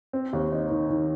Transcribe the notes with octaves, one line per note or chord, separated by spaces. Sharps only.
C4
D#2
D#4
D#3
D#3